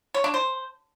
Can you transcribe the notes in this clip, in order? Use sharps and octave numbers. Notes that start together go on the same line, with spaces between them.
C#5
D4
C5